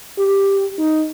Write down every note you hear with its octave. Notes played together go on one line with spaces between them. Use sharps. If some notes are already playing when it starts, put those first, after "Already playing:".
G4
D#4